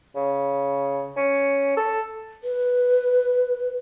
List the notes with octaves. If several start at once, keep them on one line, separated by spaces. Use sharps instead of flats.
C#3
C#4
A4
B4